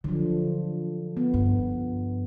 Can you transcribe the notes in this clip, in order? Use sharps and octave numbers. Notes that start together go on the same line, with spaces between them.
D3 F3 F#3
B3
G2